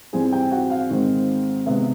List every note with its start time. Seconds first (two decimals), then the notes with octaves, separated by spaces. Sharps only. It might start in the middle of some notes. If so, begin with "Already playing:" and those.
0.13 G#2 E3 G3 C4 G#4 G#5
0.32 G4 G5
0.51 F#4 F#5
0.70 F5
0.90 G#2 D#3 G#3 C4
1.66 C3 D#3 G#3 B3 E5